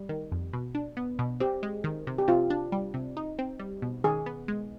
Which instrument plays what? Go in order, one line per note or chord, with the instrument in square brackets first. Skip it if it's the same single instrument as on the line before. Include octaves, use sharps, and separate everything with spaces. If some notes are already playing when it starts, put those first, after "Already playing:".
Already playing: [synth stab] G3
D#3
F2
B2
D4
B3
B2
[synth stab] C4 [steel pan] G4
[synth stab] G#3
D#3
C3
[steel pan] G4
[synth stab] C3 [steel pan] F4
[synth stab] D4
G3
C3
D#4
C4
G3
B2
[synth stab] D#3 [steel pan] G#4
[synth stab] B3
G#3